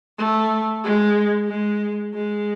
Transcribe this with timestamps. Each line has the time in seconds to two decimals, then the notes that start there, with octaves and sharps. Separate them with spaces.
0.18 A3
0.84 G#3
1.48 G#3
2.14 G#3